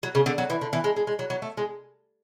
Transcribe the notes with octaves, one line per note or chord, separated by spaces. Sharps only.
F#3
C#3
D3
F#3
E3
D3
E3
G#3
G#3
G#3
F#3
F#3
A3
G#3